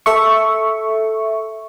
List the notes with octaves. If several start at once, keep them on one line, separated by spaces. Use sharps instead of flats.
A4 E5 C#6